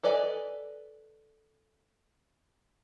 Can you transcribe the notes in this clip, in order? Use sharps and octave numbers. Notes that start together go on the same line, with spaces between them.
A4 B4 D5 D#5 G#5